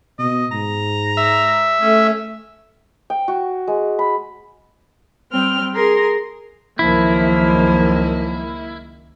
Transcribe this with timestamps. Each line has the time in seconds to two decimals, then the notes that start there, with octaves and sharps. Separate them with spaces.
0.19 B2 D#5
0.52 G#2 A#5
1.17 E5
1.81 A3 C#4
3.10 G5
3.28 F#4
3.67 G#3
3.99 B5
5.32 G3 C4 G5 F6
5.74 G#4 A#4 C6
6.79 C#2 F#2 D#3 F3 A#3 E4